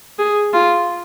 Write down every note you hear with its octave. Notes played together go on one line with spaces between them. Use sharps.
G#4
F4